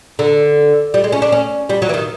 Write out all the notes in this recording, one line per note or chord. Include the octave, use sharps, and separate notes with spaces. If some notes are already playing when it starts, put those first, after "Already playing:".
D3
G3
G#3
C#4
D4
C#4
G3
F#3
E3
D#3